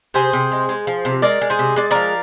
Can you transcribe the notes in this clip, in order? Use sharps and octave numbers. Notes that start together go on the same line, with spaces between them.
C3 G#4 C5
C3
G#3
G#3
F3
C3
G#3 A#4 D5
G#3
G#4 C5
C3
G#3 D5
F3 A#4 D5